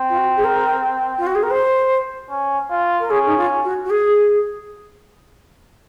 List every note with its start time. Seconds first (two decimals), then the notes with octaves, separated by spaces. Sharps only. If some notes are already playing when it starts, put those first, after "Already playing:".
Already playing: C4
0.10 F4
0.18 F#4
0.37 G#4
0.44 A#4
1.18 F4
1.27 F#4
1.35 G#4
1.43 A#4
1.51 C5
2.30 C#4
2.70 F4
3.00 A#4
3.10 C#4 G#4
3.26 D#4
3.37 F4
3.64 F#4
3.85 F#4
3.90 G#4